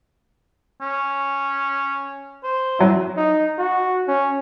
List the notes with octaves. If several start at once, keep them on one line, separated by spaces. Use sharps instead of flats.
C#4
C5
F#3 E4
D#4
F#4
C#4